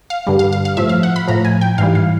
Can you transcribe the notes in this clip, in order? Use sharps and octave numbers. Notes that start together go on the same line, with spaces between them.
F5
G2 D3 G3
F5
F5
F5
A2 F3 E5
F5
F#5
B5
A2 F3 A#5
G#5
G5
G#2 E3 G3 F5
F5